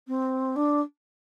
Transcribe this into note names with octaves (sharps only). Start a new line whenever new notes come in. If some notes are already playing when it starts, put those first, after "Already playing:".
C4
D4